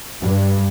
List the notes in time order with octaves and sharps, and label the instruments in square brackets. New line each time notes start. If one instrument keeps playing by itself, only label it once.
[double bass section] G2